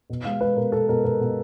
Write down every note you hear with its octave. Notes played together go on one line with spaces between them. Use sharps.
B2
G#3 F5
G#3 B4
B2 A#4
B2 A4
B2 A#4
B2 A#4
B2